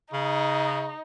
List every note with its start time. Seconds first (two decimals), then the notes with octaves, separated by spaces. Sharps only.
0.13 C#3 D#4